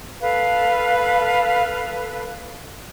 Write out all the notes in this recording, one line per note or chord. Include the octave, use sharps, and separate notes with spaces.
A4 B4 F5